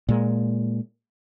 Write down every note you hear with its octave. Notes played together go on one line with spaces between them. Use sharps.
A#2 G#3